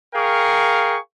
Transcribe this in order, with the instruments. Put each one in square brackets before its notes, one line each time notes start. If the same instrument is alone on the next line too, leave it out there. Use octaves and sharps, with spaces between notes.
[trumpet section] G#4 A#4 F5 G5 C#6